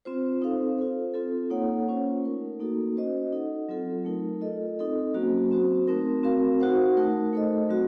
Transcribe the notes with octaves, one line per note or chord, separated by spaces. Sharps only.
C4 F4 C5
C4 D#4 A4 C5 F5
F4 A4 C5
C4 F4 A4
A#3 D#4 A4 C#5 F#5
A#3 C#4 F4 C5
A3 D#4 A#4
A#3 D#4 F#4 A4
C#4 F#4 C5 D#5
D#4 A4 D#5 F#5
F#3 C4 F4 A4
A3 D#4 A#4
F4 A4 D#5
C4 D#4 A4 D#5
F#3 A#3 C#4 F#4 C5
C4 F#4 C5
A3 C4 D#4 A#4
C4 F#4 A#4 F5
D#4 F#4 C5 F#5
A3 D#4 A#4
A3 D#4 A4 C5 D#5
F#3 C4 F#4